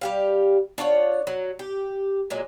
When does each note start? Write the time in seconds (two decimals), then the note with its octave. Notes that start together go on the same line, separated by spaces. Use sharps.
0.01 G3 G4 F5
0.78 D4 F4 C#5 F#5
1.27 F#3
1.59 G4
2.30 A#2 F#3 G#3